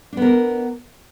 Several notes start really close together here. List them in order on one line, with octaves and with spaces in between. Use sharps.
D4 B3 A#4